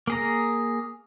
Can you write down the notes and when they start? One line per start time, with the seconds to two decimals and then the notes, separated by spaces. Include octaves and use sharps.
0.07 A#3 G#4 A#5